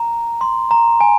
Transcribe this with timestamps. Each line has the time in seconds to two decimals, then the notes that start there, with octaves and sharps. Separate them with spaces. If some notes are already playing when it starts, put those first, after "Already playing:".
Already playing: A#5
0.41 C6
0.71 A#5
1.01 G#5